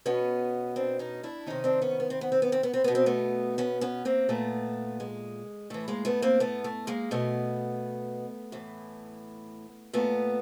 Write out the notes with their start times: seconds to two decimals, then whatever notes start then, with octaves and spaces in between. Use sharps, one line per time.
0.06 B2 B3 C#4
0.76 C4 D4
0.99 C#4 D#4
1.23 D4 E4
1.46 C3 D#3 C#4 D#4
1.64 C4 D4
1.82 B3 C#4
2.00 B3
2.10 C4
2.21 B3
2.32 C4
2.42 B3
2.52 C4
2.63 B3
2.74 C4
2.84 B2 B3
2.95 C4
3.06 A3 B3
3.58 B3 C#4
3.81 B3 C#4
4.05 A#3 C4
4.29 A#2 A3 B3
5.00 G#3
5.70 A2 E3 A3
5.88 G#3 A#3
6.05 A3 B3
6.22 A#3 C4
6.40 A3 B3
6.64 A3
6.87 G#3 A#3
7.11 B2 A3 B3
8.52 A2 E3
9.93 A#2 A3 B3